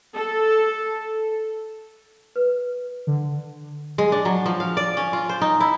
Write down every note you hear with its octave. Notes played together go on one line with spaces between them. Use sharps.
A4
B4
D3
G#3
D4
F#3
F3
F5
D5
C#4
F4
C5
D#4
E4